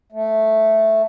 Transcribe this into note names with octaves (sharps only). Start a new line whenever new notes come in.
A3